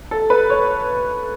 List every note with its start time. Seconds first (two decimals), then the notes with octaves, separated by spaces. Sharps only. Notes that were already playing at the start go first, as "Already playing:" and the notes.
0.11 A4
0.30 B4
0.50 C#5